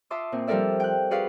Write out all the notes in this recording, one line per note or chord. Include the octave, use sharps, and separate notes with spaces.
F4 E5 A5 C6 D6 D#6
A#2 C4
F3 G3 A4 A#4 D5 E5
G5 F#6
F#4 G#4 B4 D5 F5